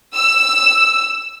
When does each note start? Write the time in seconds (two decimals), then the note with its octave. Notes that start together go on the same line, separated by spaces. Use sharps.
0.14 E6